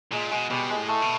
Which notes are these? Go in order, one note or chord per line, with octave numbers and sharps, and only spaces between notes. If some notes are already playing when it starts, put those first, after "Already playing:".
A#2 G#3
B2 G#3
B2 G3
G#3
A2
A3
B2